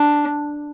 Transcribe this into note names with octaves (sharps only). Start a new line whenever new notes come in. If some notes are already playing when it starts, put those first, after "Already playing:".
Already playing: D4